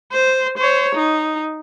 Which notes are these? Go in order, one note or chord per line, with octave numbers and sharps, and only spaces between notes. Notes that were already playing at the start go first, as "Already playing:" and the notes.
C5
C5 C#5
D#4